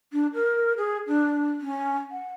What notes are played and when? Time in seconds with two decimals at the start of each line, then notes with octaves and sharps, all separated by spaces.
0.12 D4
0.34 A#4
0.77 G#4
1.07 D4
1.61 C#4
2.11 F#5